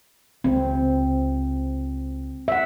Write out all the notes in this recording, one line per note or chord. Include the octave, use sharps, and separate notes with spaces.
C#2 C4
E5 F#5